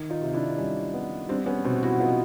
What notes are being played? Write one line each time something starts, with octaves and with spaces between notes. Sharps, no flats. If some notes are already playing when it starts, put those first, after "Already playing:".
Already playing: D#3
D#4 F4
C3
D4 E4
G3 C#4 D#4
B3
G3 C4 D4
B3 C#4
B2 C4
E4 F#4
B3 D#4 F4